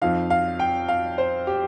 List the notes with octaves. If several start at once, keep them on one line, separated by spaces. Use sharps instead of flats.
F2 F3 D#4 F5
F5
G5
F5
C5
G4